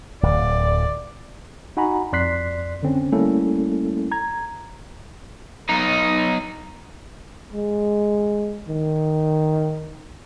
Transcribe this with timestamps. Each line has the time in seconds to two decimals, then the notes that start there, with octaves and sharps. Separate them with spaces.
0.23 D1 D5
1.77 D#4 F#4 F#5 G#5 A#5 B5
2.13 F2 D5 C6 F#6 B6 C7
2.83 D3 C4 C#4
3.12 G3 A3 A#3 C#4 E4 A4
4.12 A#5 G#6
5.69 B1 D#4
7.52 G#3
8.68 D#3